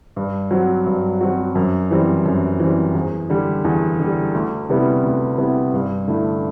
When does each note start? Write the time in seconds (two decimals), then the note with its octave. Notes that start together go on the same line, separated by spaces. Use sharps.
0.16 G2
0.51 F#3 C4 F#4
0.86 G2
1.21 F#3 C4 F#4
1.55 F#2
1.91 E3 G3 C4
2.26 F#2
2.60 E3 G3 C4
2.95 E2
3.30 D3 G3
3.65 E2
4.00 D3 G3
4.34 D2
4.69 C3 G3 B3 E4
5.04 D2
5.38 C3 G3 B3 E4
5.74 G2
6.08 D3 A3 E4